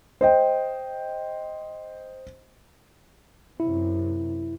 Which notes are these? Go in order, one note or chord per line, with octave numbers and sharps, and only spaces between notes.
C5 D#5 G5
F#2 C3 E4